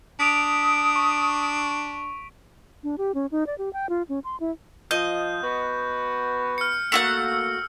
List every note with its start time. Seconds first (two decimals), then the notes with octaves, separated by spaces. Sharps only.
0.19 D4 D#6 B6 D7 F7
0.96 C#6
2.83 D4
2.98 G4
3.15 C#4
3.32 D#4
3.47 D5
3.58 G4
3.73 G5
3.89 F4
4.09 C#4
4.24 C6
4.40 E4
4.91 F3 F4 D#5 G6
5.42 B3 F#4 B4
6.58 F6 C#7
6.92 A3 A#3 F#4 F#5 E6 C#7